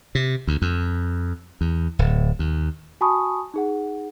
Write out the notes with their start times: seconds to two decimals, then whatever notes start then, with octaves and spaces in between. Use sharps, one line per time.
0.15 C3
0.47 D2
0.62 F2
1.61 E2
1.99 D1
2.39 D#2
3.01 F#4 G#5 A5 B5 C#6 D#6
3.54 D#4 G#4 F#5